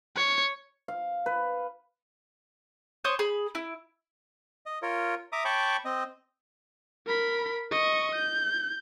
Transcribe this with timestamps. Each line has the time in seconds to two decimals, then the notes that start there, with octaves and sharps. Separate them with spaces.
0.17 C#5
0.88 F5
1.26 B4
3.04 C5 C#5 C6 D#6
3.19 G#4 B5
3.55 E4
4.66 D#5
4.82 F4 A#4 C#5
5.32 E5 A#5 D6 D#6
5.45 C#5 G5 A5 B5 C#6 D6
5.85 C4 D#5
7.07 A#4 B5
7.71 D#5 C#6
8.15 G6